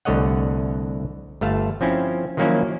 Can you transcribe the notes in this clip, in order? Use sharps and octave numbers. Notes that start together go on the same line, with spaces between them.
C2 D3 A3 C#5 D#5 F#5
G1 A3 F5 A5
F3 C4 C#4 E4
D#3 F3 F#3 A#3 C#4 E4